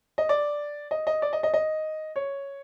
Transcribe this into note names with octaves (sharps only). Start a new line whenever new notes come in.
D#5
D5
D#5
D#5
D5
D#5
D#5
D#5
C#5